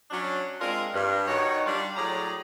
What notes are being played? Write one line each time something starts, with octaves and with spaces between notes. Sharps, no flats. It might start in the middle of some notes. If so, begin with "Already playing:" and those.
F#3 C#4 D4
G#3 C4 D4 F4 A#4
G2
D#3 D#4 F#4 C#5
G3 D4 F4
A2 F#3 G#4 D5 A#5